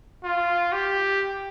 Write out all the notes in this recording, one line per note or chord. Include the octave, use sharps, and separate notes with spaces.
F4
G4